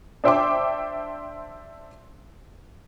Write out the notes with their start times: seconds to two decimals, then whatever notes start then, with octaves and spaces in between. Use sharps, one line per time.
0.24 D4 C5 E5 G5 C6 D6